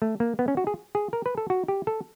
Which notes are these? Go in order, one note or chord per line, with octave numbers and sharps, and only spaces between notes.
A3
A#3
B3
C#4
F#4
G#4
G#4
A#4
B4
A4
F#4
G4
A4